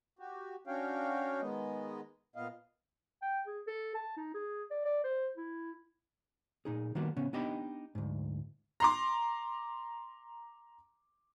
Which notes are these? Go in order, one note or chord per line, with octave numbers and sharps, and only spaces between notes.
F#4 G4
C#4 D4 F#4 C#5 F5 G5
D#3 G#3 B3 D#5
A#2 B3 D#5 F5
G5
G#4
A4
A5
D#4
G#4
D5
D5
C5
E4
A#2 D#4 G#4
D#3 G3 A#3 B3 F#4
C#3 B3 C#4
B3 D4 D#4 G4 D#5 B5
D2 G#2
A#5 C6 D6